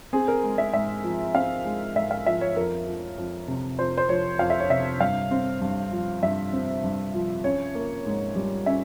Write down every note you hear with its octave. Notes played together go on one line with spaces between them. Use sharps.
C4 G#4
A#4
G#3
E5
G#2 E5
F3
C4 F5
G#3
G#2 E5
F5
F3 E5
C#5
F2 A#4
F3
F2
C3
F2 C5
C5
F3 C#5
F2 F5
E5
C#5
C3 E5
G2 F5
C4
G2
F3
G2 E5
C4
G2
F3
C#4 C#5
A#3
G#2
G3
C#4 E5